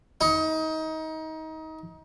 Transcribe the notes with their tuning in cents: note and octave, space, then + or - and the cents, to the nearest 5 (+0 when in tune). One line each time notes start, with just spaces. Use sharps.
D#4 +25